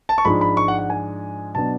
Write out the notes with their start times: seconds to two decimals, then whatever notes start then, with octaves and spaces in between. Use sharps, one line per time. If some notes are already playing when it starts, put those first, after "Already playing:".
0.09 A5
0.18 C#6
0.25 G#2 F3 G#3 D4 B5
0.41 B5
0.57 C#6
0.68 F#5
0.79 F#5
0.90 G#5
1.55 B2 F#3 B3 D4 A5